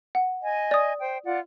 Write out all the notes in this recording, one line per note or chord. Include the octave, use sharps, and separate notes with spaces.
F#5
D#5 G#5
D5 D#6
C5 G5
F4 D5 F#5